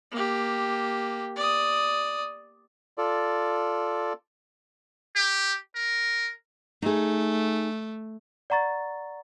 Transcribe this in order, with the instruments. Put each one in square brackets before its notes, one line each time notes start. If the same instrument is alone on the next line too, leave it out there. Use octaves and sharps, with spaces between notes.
[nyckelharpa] A#3 G4
D5 D#6
[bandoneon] F4 A4 D5
[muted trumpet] G4
A#4
[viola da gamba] A3 [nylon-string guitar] D#4 G#4
[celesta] D5 F#5 A#5 C#6 A6